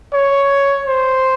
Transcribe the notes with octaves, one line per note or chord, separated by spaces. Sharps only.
C#5
C5